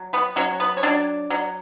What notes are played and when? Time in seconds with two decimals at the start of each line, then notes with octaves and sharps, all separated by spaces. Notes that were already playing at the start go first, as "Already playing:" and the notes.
Already playing: F#3
0.13 B3 B4
0.36 F#3 C#4 C#5
0.60 B3 B4
0.77 C#5
0.83 F#3 D4 D5
1.30 F#3